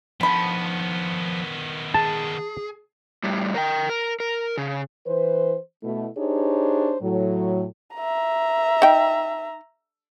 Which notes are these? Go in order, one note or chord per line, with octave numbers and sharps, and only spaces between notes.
D3 D#3 F3 B3 A5 B5
G#4 A5
A2 G3
A#4 G5
A#4
A#4
C#3
E3 B4 C5
B2 A3 E4
D4 D#4 G4 G#4 C5 C#5
A2 F#3
E5 A#5
D#4 G5